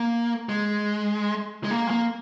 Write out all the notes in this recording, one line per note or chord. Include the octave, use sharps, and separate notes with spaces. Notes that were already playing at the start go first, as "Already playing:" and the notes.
Already playing: A#3
G#3
G#3
A#3
G#3
A#3